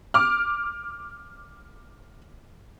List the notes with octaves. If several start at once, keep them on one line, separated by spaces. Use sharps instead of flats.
D6 F6